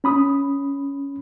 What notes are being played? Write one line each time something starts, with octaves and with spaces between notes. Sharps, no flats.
C#4 B5 D#6